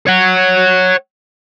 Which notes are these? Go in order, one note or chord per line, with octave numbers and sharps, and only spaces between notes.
C#5 F#5